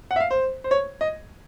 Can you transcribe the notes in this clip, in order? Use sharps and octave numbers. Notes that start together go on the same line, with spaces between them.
F#5
E5
F5
C5
C5
C#5
D#5